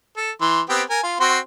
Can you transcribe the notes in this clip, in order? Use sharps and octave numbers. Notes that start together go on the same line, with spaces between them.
A4
E3 C6
B3 C4 G4
A#4 G#5
F4
C4 F#4 C6